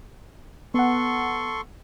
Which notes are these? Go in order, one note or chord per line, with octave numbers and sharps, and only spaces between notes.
B3 A4 F#5 C6 C#6